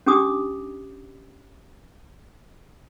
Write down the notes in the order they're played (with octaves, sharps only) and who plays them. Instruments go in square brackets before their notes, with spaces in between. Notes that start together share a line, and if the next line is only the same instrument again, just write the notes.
[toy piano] C#4 D4 G4 D6 D#6